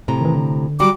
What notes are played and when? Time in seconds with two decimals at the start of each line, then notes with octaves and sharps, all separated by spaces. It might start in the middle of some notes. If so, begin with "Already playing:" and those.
0.08 A2 C3 A#5
0.21 D#3 E3
0.35 D3
0.80 F#3 G3 F#4 D6